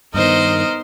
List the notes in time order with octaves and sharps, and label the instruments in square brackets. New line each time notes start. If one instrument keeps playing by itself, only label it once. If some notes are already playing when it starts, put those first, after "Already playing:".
[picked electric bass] G2 D#3 [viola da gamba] B3 D#4 C5 [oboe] A#4 [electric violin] D#5